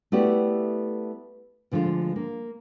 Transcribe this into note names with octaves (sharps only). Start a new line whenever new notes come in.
A3 B3 E4 F#4 G4 D5
D2 D3 F3 G#3 F4 C5
A#3